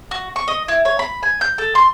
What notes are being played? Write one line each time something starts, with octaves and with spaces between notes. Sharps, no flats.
F#4
C#6
D#5
E4
C#5
B5
G#5
G6
A4
C6